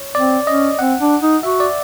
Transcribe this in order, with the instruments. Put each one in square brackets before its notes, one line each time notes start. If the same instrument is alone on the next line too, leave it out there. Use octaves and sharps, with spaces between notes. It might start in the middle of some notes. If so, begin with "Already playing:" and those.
Already playing: [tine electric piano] C#5
[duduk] C4 [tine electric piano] D5
[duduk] C#4 [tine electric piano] D#5
[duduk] C4 [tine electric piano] F#5
[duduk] D4
D#4
[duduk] F#4 [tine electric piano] E5
[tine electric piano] D5